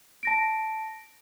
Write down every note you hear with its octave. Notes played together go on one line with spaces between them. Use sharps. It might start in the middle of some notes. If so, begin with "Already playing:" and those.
A5 A#6 D7